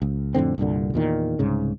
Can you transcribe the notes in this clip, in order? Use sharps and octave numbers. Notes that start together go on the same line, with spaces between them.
C#2
F2 A2 D3 C4
C2 G2 A#2 D3
E2 A#2 D#3
C2 G#2 C#3